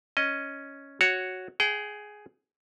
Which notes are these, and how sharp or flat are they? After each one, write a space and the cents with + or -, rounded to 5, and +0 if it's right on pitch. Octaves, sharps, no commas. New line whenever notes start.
C#4 +0 D#5 +0
F#4 +0 C#5 +0
G#4 +5 G5 -35